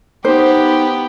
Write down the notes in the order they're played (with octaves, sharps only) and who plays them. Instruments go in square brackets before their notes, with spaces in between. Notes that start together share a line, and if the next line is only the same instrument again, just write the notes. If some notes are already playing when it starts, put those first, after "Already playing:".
[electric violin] B3 G4 [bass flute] D#4 [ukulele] C5